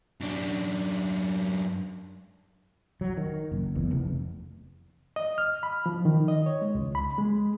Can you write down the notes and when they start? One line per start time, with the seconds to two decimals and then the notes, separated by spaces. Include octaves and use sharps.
0.21 F#2 D4
3.01 F#3
3.17 D#3
3.52 F#1
3.75 E2
3.91 F1
5.16 D#5
5.38 F6
5.63 B5
5.86 F3
6.05 D#3
6.28 D#5
6.46 C#5
6.62 G#3
6.75 C#2
6.95 B5
7.18 G#3